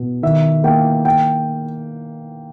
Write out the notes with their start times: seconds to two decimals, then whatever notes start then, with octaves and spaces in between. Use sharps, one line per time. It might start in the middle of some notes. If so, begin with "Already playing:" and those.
Already playing: B2
0.23 D#3 E5
0.64 A#3 G5
1.05 G5